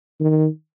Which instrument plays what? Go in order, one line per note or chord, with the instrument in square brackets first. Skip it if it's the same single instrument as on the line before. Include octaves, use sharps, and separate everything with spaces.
[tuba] D#3